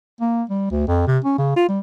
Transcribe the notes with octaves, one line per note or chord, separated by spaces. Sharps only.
A#3
G3
D2
F2
C3
C#4
C#3
F4
G3